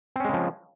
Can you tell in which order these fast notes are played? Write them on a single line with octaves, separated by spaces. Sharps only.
C4 C#4 G#3 C#3 F3